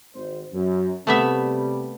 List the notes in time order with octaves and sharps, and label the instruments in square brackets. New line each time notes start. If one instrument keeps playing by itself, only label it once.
[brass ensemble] G#1 C5
F#2
[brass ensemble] C3 G3 [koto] A3 B3 E5